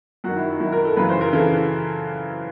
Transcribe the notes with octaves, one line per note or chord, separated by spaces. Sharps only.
F#2 D#3 F#4
E4
D#4
F#2 D#3 E4
A#4
A4
F#2 C#3 E3 B4
C5
A#4
C#3 E3 A4